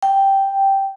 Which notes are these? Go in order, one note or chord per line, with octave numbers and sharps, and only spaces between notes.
G5